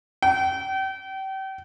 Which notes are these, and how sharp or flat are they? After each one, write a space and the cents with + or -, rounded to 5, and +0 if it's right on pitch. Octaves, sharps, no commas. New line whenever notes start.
G5 -35